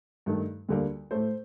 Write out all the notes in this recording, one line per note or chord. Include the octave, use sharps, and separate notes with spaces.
G2 D#3 A3
D2 D3 G3 A#3
A2 A3 C5